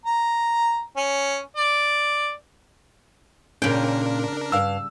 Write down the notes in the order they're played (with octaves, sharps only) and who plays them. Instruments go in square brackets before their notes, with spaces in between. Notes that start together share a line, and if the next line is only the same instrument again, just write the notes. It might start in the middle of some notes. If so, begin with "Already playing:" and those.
[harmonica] A#5
C#4
D5
[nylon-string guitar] A#2 C#4 [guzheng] C#3 G5 [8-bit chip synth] D4 A#4
[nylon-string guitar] G2 [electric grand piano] F5 E6